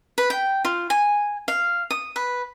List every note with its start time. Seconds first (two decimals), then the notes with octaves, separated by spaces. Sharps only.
0.18 B4
0.30 G5
0.65 F4
0.90 G#5
1.48 F5
1.91 D#6
2.16 B4